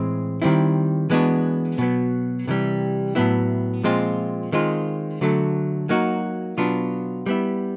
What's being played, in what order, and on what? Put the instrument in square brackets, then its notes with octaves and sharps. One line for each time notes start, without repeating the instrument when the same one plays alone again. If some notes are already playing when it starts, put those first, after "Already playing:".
Already playing: [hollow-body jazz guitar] A2 E3 G#3 C4
D#3 G3 C4 E4
E3 G#3 B3 D4 F#4
B2 F#3 B3
C3 E3 G3
A2 F#3 B3 E4
A#2 F3 G#3 C4 F4
D#3 G#3 C4 F4
D3 F#3 A3
F#3 A#3 D#4 F#4
B2 F#3 B3 D4 F4
G3 B3 E4